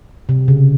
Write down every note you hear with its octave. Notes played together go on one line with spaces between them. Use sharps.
C3
C#3